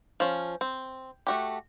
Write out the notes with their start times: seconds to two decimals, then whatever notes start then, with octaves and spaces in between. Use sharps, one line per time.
0.20 F3 C#4
0.61 C4
1.27 A3 F#4 G4